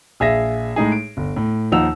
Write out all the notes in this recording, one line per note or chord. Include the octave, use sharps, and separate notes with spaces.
A#1 G#4 E5 F5 A#6
A2 G#3 D#4 G#4
D7
G1
A2
D#2 F3 D#4 F#5 E6 F7